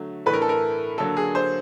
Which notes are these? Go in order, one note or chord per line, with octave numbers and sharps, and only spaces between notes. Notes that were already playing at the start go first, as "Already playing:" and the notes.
Already playing: D3 F#3 A3
A2 E3 A3 B4
A#4
A4
A#4
D3 F#3 A#3 A4
G#4
C5